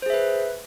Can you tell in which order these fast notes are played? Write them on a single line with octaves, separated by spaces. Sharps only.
C5 G#4 E5 B4